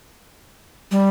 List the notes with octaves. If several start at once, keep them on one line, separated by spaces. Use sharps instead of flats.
G3